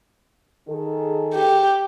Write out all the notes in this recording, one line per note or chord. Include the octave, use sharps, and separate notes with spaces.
D#3 G#4 A4
G4